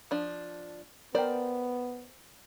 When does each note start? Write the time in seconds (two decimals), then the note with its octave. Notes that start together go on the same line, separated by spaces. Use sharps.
0.11 F3 D4
1.15 B3 A#4 C5 D5 G5